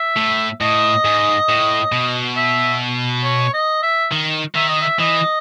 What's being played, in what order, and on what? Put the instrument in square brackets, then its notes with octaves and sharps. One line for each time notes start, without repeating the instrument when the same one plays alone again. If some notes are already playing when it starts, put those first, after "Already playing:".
Already playing: [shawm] E5
[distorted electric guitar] A2
[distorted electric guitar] A2 [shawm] D#5
[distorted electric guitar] G#2
A2
B2
[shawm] E5
C#5
D#5
E5
[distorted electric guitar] D#3
[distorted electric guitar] D#3 [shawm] E5
[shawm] D#5
E5
[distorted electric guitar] E3 [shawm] D#5